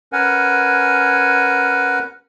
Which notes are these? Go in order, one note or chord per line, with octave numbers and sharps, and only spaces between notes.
C#4 A#4 B4 F#5 G#5